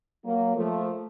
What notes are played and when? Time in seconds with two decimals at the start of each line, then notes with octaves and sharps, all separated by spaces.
0.25 F#3 A#3
0.56 F3 A3